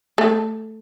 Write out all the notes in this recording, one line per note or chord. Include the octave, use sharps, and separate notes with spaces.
A3